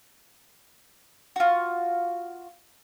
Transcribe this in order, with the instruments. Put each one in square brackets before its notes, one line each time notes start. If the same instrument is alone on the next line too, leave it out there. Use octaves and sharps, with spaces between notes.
[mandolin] F4 F#4